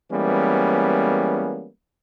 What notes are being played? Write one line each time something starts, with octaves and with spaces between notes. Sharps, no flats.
E3 G3 G#3 A#3 B3 C#4